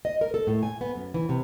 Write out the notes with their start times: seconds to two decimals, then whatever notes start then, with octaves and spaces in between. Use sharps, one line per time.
0.05 D#5
0.21 A#4
0.34 A4
0.47 A2
0.63 G#5
0.81 B3
0.95 F#2
1.14 E3
1.29 C3